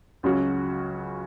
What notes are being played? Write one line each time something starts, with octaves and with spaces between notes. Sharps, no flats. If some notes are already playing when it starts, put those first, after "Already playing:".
C#2 C#3 F#3 C#4 F#4